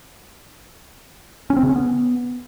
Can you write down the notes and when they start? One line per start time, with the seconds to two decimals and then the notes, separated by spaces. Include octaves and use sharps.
1.50 C#4
1.56 C4
1.63 C#3
1.69 C#4
1.76 B3